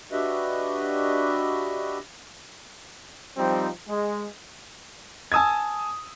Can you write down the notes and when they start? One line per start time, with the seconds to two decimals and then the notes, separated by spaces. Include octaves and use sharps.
0.12 D4 F#4 G4 B4 D#5 E5
3.37 F3 G3 C4 D#4
3.88 G#3
5.32 G#5 A5 D#6 E6 G#6